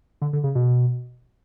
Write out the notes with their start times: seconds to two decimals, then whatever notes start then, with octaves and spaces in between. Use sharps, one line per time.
0.22 D3
0.33 D3
0.44 C#3
0.55 B2